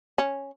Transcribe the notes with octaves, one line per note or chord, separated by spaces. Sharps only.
C#4